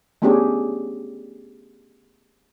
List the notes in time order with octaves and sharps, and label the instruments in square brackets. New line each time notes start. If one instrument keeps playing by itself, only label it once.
[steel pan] A3 B3 C#4 D4 G4 G#4